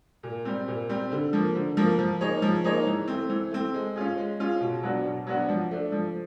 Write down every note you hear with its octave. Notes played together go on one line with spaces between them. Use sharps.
A#2
G3 C4
A#2
G3 C4
D3
F3 A#3
D3
F3 A#3
F3
A#3 D#4 G#4 C#5
F3
A#3 D#4 G#4 C#5
E3
A3 C4
E3
A3 C4
G#3
C#4 F4 G#4
G#3
C#4 F4 G#4
B2
F#3 B3 D4 F#4
B2
F#3 B3 D4 F#4
F3
A3 D4
F3